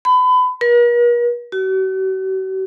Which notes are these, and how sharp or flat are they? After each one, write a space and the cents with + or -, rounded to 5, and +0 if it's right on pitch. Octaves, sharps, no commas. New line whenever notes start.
B5 +30
A#4 +45
F#4 +45